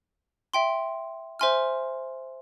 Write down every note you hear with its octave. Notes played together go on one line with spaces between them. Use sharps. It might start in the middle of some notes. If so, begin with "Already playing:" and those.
E5 G5 C6
C5 E5 G#5 C6 F6